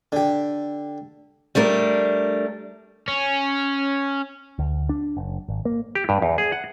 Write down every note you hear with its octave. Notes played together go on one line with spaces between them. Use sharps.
D3 G4
G3 A3 D4 A#4
C#4
D2
D4
F#1
G#1
A#3
G4
G2
E2
G#4
F#5